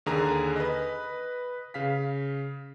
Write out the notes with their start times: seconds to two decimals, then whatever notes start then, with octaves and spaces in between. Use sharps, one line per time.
0.06 D#2 D3 G#4 A#4 G#5 A#5
0.56 B4 D#5
1.74 C#3 F5 B6